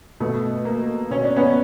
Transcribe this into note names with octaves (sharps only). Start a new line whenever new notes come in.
B2 A3
A#3
B2 C#4
D4
B3 C#4